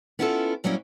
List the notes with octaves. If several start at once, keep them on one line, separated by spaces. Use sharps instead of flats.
B3 C#4 E4 F4 G4 A4
F#2 F#3 G3 A#3 C#4 E4